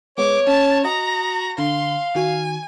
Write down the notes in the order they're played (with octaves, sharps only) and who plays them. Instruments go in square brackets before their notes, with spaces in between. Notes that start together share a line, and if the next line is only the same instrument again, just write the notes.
[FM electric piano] G#3 B3 [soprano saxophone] C#5 [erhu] D6
[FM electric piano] C#4 [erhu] A5
[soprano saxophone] F#4 [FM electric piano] D#5 [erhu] A#5
[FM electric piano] D3 [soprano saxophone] F5 [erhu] C6
[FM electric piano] D#3 F#4 [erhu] G#5